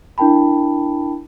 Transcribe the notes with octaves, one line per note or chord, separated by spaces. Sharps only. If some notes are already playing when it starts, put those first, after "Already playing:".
D4 E4 A#4 G5 A5 B5